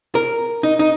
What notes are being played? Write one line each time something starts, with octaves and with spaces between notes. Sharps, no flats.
A#4
D#4
D#4